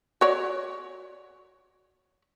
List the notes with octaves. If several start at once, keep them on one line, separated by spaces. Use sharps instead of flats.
F#4 C#5 D5